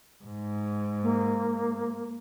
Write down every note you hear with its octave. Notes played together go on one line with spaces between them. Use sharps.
G#2
A#3